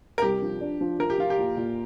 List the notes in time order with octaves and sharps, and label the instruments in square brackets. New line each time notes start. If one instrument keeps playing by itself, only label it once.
[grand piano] A#4
[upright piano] C2 [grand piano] G4
[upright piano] F3
D4
F3
[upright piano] F3 [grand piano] A#4
[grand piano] G4
[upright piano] F3 [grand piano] F4
[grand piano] G4
[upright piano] A#2
A#2